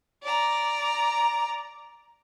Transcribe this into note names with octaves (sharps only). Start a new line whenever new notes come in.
D5 A#5